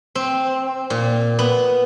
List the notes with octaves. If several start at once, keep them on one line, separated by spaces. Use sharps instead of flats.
C4
A#2
B3